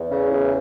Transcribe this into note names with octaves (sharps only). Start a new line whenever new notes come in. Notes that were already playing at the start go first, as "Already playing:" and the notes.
Already playing: E2
C#3
E2